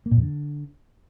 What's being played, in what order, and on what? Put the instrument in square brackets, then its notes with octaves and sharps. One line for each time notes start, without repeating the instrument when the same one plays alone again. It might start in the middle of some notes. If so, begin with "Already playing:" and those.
[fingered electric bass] A#3
A#2
F2
D3